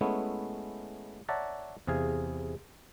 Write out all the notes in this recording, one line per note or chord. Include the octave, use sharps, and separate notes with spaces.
G#3 A3 B3 C#4 E4
C#5 D5 E5 F#5 A5 A#5
E2 C3 G#4 F5 G#5